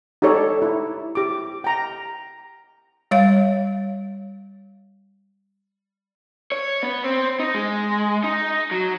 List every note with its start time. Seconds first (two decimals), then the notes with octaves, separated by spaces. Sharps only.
0.22 D#4 G4 A4 C#5 D5
0.62 E4
1.15 G4 D6
1.64 G5 A#5
3.11 G3 C#5 F5
6.52 C#5
6.83 B3
7.04 C4
7.40 D#4
7.54 G#3
8.24 D#4
8.71 F#3